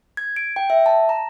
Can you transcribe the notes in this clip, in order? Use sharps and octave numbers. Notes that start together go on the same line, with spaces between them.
G#6
D7
G5
E5
A5
A#5